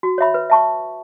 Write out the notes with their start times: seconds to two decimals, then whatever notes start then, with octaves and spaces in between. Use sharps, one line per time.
0.03 F#4
0.18 C#5 E5 B5
0.34 B4
0.50 E5 A5 C#6